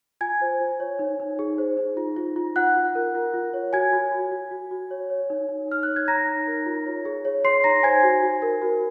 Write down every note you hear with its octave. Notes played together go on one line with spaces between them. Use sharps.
F4 G#5 G#6
C5
F4
C#5
D#4
D#4
G#4
C5
D#4
F4
F4
F4
F4 F#5 F#6
F4
A#4
F4
F4
C#5
F#4 G#5 G#6
F#4
F#4
F#4
F#4
F#4
C#5
C#5
D#4
D#4
D#4 F6
C#5 F#6
G#6
D#4 A#5 A#6
D#4
A#4
F4
C#5
G#4
C#5
C#5 C6 C7
D#4 A#5 A#6
C5 G#5 G#6
F#4
F#4
A#4
F#4